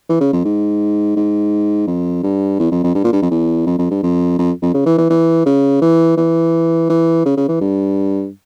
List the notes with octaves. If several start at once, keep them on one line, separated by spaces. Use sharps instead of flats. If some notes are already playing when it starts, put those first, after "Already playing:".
E3
C#3
F2
G#2
G#2
F2
G2
E2
F2
F2
G2
A#2
G2
F2
E2
F2
F2
G2
F2
F2
F2
C#3
E3
E3
E3
C#3
E3
E3
E3
C#3
C#3
E3
G2